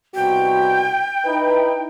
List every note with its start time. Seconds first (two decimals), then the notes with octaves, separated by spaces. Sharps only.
0.15 C2 B2 F#4 G5
1.26 D#4 E4 B4